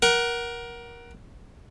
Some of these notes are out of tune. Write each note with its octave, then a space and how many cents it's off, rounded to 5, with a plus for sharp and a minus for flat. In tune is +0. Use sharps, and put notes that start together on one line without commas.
A#4 +20 F#5 +15